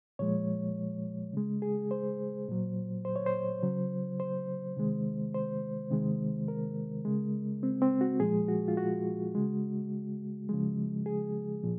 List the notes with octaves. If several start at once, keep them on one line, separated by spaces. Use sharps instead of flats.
A#2 F3 G#3 C#5
C#3 G#3
G#4
C5
A#2 F#3
C5
C#5
C5
C#3 F#3
C5
C3 D#3 G#3
C5
C3 D#3 G#3
A#4
C#3 G#3
C4
C4
F#4
A#2 F3 G#3 G#4
F#4
F4
F#4
C#3 G#3
C#3 F3 G#3
G#4
A#2 F3